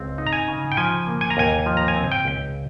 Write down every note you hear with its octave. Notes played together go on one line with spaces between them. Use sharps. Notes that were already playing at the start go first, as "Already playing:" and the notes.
Already playing: C#2 C4
D#4
A#5
G#5
C#3
G5
F3 G#5
A#3
G#5
A#5
D#2 G#5
F3
A#5
G#5
C4
G5
C#2